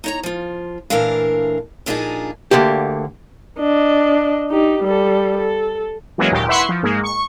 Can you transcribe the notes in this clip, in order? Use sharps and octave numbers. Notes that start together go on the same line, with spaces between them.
D#4 C#5 A#5
F3 F4
A#2 E3 A3 D4 A#4 F5
A#2 F3 D4 D#4 G4 G#4
D2 G#2 D3 A#3 G4
D4 D#5
D#4 G4
G3 A4
A4
E3 F#3 G#3 A#3 C#4
G#1 D#2 A#2 G4
E4 B4 E5 F#5 C6 C#6
F3
G#2 G#3 A#3
C#6